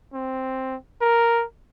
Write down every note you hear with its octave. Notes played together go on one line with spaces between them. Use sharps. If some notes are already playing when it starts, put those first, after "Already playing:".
C4
A#4